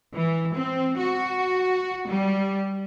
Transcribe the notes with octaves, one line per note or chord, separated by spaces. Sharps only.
E3
C4
F#4
G3